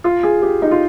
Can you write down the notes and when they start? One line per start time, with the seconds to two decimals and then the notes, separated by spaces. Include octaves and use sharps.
0.04 F4
0.23 G#4
0.42 G4
0.62 D#4
0.71 F4